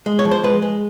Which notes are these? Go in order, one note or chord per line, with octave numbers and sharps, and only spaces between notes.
G#3
C#5
F3
C5
G#3 B4
G#3